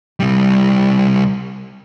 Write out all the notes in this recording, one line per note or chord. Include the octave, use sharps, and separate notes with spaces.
C2 G3